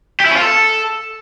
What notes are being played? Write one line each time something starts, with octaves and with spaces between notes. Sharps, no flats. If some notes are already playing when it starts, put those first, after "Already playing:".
G4
E4
C#4
F4
A4